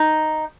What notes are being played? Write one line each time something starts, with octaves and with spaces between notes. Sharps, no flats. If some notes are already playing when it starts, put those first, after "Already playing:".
Already playing: D#4